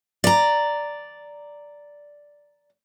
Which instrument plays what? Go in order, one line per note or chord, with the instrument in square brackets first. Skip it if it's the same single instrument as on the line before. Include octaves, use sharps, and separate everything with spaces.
[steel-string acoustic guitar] D5 A#5